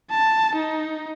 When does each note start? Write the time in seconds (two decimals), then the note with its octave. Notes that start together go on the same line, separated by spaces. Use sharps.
0.11 A5
0.56 D#4